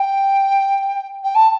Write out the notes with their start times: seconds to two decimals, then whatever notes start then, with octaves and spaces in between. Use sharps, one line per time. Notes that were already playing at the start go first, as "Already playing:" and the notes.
Already playing: G5
1.24 G5
1.35 A5